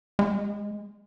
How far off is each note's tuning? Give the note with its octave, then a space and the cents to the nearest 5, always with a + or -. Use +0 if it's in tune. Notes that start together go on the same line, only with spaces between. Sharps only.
G#3 -10